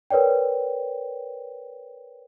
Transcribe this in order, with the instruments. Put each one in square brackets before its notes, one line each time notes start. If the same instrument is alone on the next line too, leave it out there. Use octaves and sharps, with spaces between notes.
[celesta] A#4 B4 C#5 D5 G5